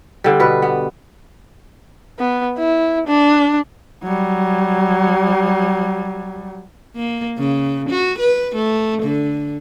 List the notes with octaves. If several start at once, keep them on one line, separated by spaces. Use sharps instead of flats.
D3 G3
B2 B4
B3
B3
E4
D4
F#3 G3
A#3
C#3
F#4
B4
A3
D3